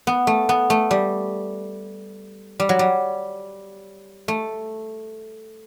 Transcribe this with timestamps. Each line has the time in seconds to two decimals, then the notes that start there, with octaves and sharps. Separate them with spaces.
0.07 B3
0.27 A3
0.49 B3
0.70 A3
0.91 G3
2.60 G3
2.69 F#3
2.79 G3
4.28 A3